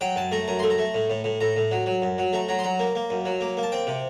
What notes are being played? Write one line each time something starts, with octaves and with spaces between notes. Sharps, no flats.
F#3 G5
F#2 A5
A3 A#5
F#2 A#5
A3 C6
A#5
A3
A2
A2
A2
A2 A#5
A2
F#3
F#3
F#2
F#3
A3 A#5
F#3 A#5
C6
F#3 A#5
A#3
A#3
F#2
F#3
A#3
A#3
A5
C4 G5
C3